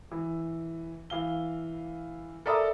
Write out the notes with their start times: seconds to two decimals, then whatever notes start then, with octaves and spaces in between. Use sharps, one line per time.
0.11 E3
1.10 E3 F5 G7
2.46 A4 A#4 D5 E5 B5 D#6